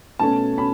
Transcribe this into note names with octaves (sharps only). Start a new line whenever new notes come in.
B2 A3 C#4 A5
C#4 B5